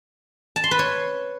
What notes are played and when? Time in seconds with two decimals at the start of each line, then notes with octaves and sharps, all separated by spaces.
0.56 A5
0.64 C6
0.71 B4
0.79 C#5